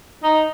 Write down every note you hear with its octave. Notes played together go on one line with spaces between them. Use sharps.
D#4